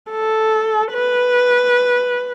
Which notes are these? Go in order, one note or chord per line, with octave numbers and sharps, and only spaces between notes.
A4
B4